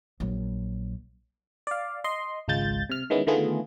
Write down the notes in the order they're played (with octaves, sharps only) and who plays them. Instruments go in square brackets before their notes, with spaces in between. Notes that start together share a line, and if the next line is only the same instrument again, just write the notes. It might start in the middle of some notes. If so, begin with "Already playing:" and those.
[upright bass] A#1 F#3
[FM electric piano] D5 F5
D#5 C6
G#1 C#2 G#3 F4 G6 A6
C3 F6
D#3 G#3 B3 C#4 E4
D3 D#3 A3 B3 F4 G#4